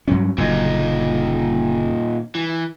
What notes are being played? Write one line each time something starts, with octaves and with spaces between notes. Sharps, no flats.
G2 F#3 C#4
F#1 F#2 A#2 D3 D#4
E3